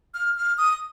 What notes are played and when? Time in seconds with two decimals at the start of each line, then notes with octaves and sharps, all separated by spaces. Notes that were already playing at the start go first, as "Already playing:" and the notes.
0.14 F6
0.37 F6
0.58 D#6